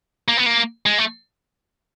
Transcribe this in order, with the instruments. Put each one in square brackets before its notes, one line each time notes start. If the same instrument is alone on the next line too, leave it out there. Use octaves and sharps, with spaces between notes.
[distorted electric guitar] A#3
B3
A#3
G#3
A3